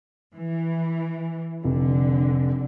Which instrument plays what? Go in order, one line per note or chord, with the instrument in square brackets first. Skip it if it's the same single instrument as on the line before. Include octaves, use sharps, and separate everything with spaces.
[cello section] E3
[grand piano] F1 [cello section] D3